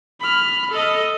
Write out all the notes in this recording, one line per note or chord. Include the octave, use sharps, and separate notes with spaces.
B5 F6
A4 D#5